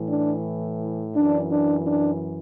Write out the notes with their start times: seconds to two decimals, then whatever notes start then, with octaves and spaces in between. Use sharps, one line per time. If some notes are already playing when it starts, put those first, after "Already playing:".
Already playing: A2 E3
0.08 D4
1.16 F#2 E3 D4
1.52 D4
1.87 D4